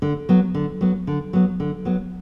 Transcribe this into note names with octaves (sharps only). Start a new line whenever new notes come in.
D3
F#3 B3
D3
F#3 B3
D3
F#3 B3
D3
F#3 B3